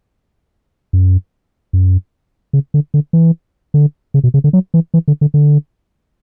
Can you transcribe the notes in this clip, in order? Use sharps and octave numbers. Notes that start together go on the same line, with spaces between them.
F#2
F#2
C#3
D3
D3
E3
D3
C#3
B2
C#3
D3
F#3
E3
E3
D3
D3
D3